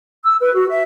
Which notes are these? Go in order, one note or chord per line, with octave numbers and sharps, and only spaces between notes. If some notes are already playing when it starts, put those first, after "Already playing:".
E6
B4
F#4
E5